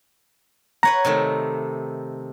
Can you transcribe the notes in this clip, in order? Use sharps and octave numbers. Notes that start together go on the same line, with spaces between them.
B4 C#5 F#5 A#5
C3 D#3 A3